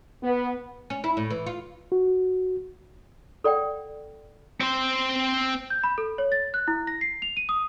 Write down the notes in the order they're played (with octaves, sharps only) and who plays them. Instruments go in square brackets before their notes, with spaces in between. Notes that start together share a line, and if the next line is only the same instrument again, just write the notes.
[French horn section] B3
[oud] C#4
E4
A2
E3
F4
[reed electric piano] F#4
[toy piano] A4 D5 F#5 G5
[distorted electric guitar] C4 C5
[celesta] G6
B5
A4
C#5
A6
F#6
E4
A#6
C7
F7
D#7
D#6